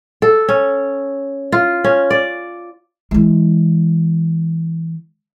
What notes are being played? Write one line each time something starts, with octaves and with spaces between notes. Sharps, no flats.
A4
C#4
F4
C#4
D5
E3 G#3